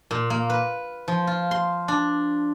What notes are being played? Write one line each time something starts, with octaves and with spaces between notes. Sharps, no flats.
A#2
A#3
B4
F3
F4
C6
D4